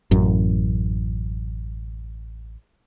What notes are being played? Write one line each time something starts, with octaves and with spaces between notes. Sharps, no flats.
A1 F#2